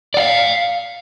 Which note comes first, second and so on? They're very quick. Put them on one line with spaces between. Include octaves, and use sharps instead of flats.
D5 F#5 F5